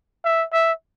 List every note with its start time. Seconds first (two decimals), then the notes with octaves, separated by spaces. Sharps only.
0.25 E5
0.52 E5